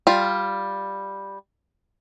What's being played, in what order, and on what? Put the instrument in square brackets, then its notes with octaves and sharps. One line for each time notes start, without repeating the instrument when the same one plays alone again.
[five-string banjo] G3 F4